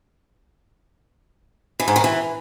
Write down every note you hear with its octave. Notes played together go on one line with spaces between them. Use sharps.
E3
G#2
D#3
E3